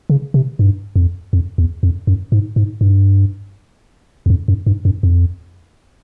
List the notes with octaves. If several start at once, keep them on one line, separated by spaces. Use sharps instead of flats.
C#3
C3
G2
F2
F2
E2
F2
F#2
G#2
G#2
G2
E2
F2
F#2
G2
F#2
F2